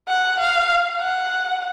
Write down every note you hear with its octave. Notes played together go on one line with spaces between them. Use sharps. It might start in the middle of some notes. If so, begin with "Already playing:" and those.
F#5
F5
F#5